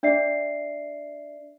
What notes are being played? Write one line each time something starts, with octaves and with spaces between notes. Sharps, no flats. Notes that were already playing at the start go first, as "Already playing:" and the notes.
D4 D5 E5 C7